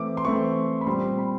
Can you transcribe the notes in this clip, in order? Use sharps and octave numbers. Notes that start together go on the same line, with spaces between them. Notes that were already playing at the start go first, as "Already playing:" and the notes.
Already playing: E3 A3 C4 D6
C6
E3 A3 C4 C#6
B5
A#2 G3 C4 C6
B5